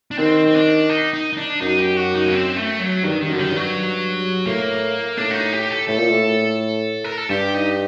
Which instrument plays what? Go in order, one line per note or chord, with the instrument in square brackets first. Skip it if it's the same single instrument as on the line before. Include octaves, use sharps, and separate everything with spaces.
[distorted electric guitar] D4
[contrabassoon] D#3 [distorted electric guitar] C4
[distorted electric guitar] C4
D4
D#4
D#4
D#4
D4
[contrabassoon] F#2 [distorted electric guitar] D#4
[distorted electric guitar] G4
F#4
D#4
A#3
C4
A3
F#3
[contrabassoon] G2 [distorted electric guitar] D#3
[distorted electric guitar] D#3
[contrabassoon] F#2
[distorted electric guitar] D3
[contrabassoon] F#2 [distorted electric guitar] D#3
[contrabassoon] G2
[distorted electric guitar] F#3
[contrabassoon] A2 [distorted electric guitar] A#3
[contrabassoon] A2 [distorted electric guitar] D4
[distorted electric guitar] F#4
D#4
G4
A4
[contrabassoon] A2 [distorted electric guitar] A4
[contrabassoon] A#2
A2
[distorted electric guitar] A#4
A4
[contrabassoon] G2 [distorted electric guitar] G4
[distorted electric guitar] D#4